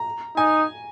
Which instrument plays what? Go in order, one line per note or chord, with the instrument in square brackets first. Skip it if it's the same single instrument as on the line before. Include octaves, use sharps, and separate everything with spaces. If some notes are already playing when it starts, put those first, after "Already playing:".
Already playing: [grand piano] A#5
[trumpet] D#4 [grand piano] G#5